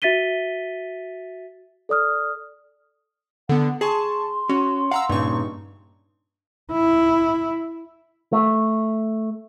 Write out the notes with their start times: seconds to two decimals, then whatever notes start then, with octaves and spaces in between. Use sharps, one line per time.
0.02 F#4 E5 A6 B6 D#7 G7
1.89 A4 D5 D#6 F6
3.49 D3 B3 F#5
3.81 G#4 A5 C6 C#6
4.49 C#4 F#4
4.91 F5 F#5 A#5 E6
5.09 G2 A#2 C#3 D#4 C#6
6.72 E4
8.33 A3